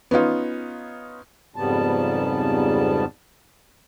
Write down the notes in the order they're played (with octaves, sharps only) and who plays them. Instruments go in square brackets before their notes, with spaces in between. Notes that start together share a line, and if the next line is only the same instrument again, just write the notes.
[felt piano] B3 C#4 D#4 F4
[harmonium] F2 G#2 C#3 G3 B3 A5